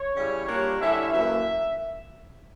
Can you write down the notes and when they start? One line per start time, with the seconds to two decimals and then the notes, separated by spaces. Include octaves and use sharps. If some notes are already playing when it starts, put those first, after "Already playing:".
Already playing: C#5
0.16 C#3 G3 C#4 E4
0.48 A#2 G3 A#3 D4
0.79 D3 G3 C#4 E4 E5
1.12 F#2 E3 A#3 E5